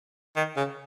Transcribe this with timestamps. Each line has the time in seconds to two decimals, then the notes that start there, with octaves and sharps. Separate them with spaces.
0.36 D#3
0.57 C#3